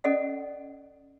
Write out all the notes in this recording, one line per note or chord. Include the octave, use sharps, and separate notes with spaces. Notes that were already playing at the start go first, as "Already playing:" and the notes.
C#4 A4 D5 D#5 F#5